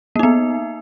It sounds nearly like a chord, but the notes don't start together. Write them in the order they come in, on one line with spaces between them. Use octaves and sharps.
A#3 D#4 B3